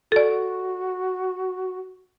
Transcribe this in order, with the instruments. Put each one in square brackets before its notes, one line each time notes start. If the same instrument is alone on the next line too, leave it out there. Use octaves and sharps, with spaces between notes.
[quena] F#4 [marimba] A4 D5